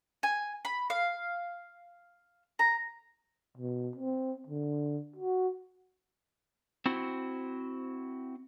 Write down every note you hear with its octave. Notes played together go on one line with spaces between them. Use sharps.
G#5
B5
F5
A#5
B2
C4
D3
F#4
C4 E4 F#4 C5